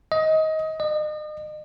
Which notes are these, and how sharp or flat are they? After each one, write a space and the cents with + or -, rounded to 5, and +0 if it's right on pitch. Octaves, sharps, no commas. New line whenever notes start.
D#5 +20
D#5 -40